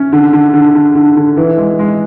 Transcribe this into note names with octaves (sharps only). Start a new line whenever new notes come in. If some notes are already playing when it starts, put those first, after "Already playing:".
Already playing: C#4
D3
D3
D3
D3
D3
D3
E3
G#3
G#3